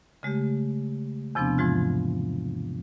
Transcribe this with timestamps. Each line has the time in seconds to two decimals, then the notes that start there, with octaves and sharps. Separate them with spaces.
0.23 C#3 G#3 A3 G4
1.35 E2 C3 F3 B3 C4 D4
1.58 G#2 E3 F3 G#3 F4